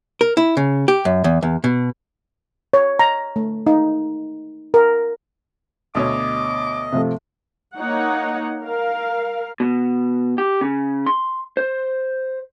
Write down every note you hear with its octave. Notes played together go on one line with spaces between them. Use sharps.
A#4
E4
C#3
G4
F#2
E2
E2
B2
C#5
A#5
A3
D#4
A#4
D2 B2 C#5 D#5 D6
C3 F3 A3
A#3 D#4 C#5 F#5
A#4 F5
B2
G4
C#3
C6
C5